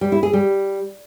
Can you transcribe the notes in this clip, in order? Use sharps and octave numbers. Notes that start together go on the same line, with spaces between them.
G3
E4
G#4
G3